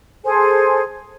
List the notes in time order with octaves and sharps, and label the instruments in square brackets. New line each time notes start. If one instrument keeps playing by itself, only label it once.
[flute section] G#4 A4 C5 G#5